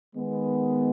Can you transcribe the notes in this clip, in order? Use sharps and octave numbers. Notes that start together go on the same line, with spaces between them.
D#3 G#3 B3